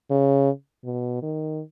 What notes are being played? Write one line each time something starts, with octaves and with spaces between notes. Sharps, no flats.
C#3
B2
D#3